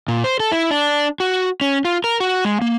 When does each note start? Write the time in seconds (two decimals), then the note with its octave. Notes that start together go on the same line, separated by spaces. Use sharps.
0.08 A#2
0.24 C5
0.40 A4
0.52 E4
0.71 D4
1.20 F#4
1.61 C#4
1.85 F4
2.04 A#4
2.20 F#4
2.45 G#3
2.62 A#3